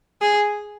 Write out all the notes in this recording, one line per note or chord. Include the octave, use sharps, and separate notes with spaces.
G#4